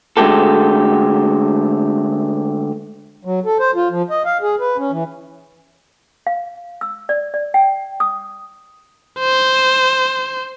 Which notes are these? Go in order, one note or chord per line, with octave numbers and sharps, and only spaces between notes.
D3 G#3 A3 F#4 G4 A4
F#3
A4
C5
F4
F3
D#5
F5
G#4
B4
C#4
E3
F5
E6
D5
D5
G5
D#6
C5